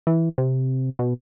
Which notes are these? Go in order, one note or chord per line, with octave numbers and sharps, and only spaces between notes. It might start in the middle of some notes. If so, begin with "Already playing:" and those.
E3
C3
B2